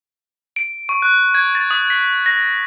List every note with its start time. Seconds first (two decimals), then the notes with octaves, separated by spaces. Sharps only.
0.56 D7
0.89 C#6
1.02 F#6
1.35 G#6
1.55 A6
1.71 D#6
1.90 B6
2.26 A#6